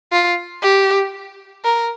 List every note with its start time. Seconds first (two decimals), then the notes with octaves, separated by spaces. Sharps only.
0.12 F4
0.63 G4
1.65 A#4